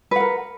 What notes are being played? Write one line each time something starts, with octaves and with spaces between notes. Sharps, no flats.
A#4 B4 F#5